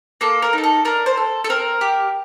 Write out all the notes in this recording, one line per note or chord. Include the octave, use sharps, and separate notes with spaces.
A#3 A4
A#4
D#4 A4
A4
D4 A#4
C5
A4
A4
C4 A#4
G4